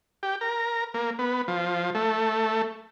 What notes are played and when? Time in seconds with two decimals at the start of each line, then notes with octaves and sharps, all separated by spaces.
0.23 G4
0.41 A#4
0.94 A#3
1.19 B3
1.48 F3
1.95 A3